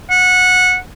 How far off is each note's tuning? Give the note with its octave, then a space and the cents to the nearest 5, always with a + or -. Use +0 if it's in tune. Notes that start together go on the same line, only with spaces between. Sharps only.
F#5 -15